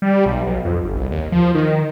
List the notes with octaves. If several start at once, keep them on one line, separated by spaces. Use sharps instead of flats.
G3
B1
B1
F2
G1
C2
D#2
F3
D#3